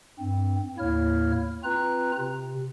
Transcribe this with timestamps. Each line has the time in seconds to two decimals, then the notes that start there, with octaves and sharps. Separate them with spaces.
0.19 G2 C4
0.78 D#2 A2 A#3 E4 C#5 F6
1.64 C4 F4 B4 A#5 F#6
2.18 C3